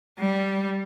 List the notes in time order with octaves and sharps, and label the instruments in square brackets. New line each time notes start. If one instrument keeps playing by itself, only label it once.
[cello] G3